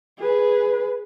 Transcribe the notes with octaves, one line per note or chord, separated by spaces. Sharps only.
G#4 B4